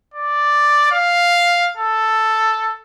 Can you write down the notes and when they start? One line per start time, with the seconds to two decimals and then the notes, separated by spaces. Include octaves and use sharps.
0.14 D5
0.91 F5
1.77 A4